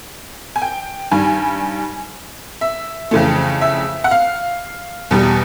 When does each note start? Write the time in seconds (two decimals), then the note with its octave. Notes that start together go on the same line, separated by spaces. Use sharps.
0.56 G#5
0.62 G5
1.11 G2 D#3 G3 G#5
2.61 E5
3.11 F2 C#3 E3 A3
3.61 E5
4.04 F#5
4.11 F5
5.11 E2 B2 G3